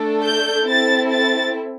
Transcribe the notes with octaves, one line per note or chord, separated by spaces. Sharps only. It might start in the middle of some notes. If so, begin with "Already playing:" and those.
Already playing: A3 D4 A4
G6
C4 E4 A4 A6
A6